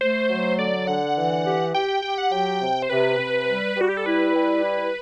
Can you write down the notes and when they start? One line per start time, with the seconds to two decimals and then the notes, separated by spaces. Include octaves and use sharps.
0.01 A3 C5
0.29 F#3
0.58 D3 D5
0.87 D3 F#5
1.16 E3
1.45 G4
1.74 G4 G5
1.88 G5
2.02 G4 G5
2.18 F#5
2.32 F#3 G5
2.61 C3
2.82 C5
2.90 C3 B4
3.19 C3
3.47 G3
3.77 G3 F#4
3.89 G4
3.97 A4
4.06 E4 B4
4.34 G3
4.63 E4